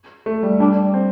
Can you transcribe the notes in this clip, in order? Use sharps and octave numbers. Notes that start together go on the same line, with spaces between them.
A3
G3
G3 D4
C4